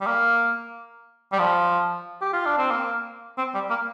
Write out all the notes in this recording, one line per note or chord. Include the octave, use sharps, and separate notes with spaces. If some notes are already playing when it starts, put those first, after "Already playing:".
G3
A#3
G3
F3
G4
F4
D4
C4
A#3
C4
G3
A#3